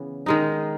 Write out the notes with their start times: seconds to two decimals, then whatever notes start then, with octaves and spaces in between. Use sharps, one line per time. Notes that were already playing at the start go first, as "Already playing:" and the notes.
Already playing: C#3 E3 B3
0.26 D#3 G#3 D#4